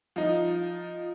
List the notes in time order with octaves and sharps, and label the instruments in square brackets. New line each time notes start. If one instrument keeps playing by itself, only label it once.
[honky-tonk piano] F3 D#4